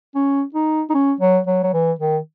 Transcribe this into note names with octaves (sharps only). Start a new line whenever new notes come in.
C#4
D#4
D#4
C#4
F#3
F#3
F#3
E3
D#3